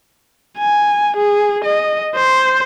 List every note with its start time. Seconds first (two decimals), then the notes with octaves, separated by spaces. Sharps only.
0.58 G#5
1.17 G#4
1.64 D#5
2.15 C5